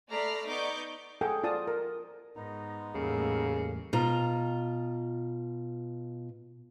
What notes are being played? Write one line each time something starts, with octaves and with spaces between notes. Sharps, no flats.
A3 D5 A#5 B5 F6 C7
B3 D#4 D5 C#6 D6 G6
G#4 A4 F#5 G5
F4 D5 A5 D#6
A#4
G#2 B3 D#4 A#5
E2 A2 C#3 G3 A3 A#3
B2 F4 A#5